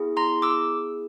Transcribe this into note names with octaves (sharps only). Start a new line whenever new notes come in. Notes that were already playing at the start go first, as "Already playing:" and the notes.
Already playing: B3 E4 G#4
A#5 C6
D6 E6